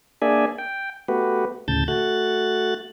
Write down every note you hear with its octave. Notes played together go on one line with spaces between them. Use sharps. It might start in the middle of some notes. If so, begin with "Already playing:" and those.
A#3 D4 G#4 D5 E5 G#5
G5
A3 B3 F#4 G4 B4
D2 A2 C#3 A5 G6 A6
A3 F#4 F#6 A6